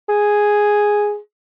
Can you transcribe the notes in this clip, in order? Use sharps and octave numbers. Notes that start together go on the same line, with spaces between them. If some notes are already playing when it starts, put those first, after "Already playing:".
G#4